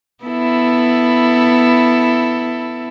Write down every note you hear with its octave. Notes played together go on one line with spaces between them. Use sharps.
B3 E4 A4